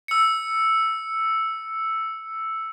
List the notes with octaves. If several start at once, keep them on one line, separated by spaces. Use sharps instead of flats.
E6 C#7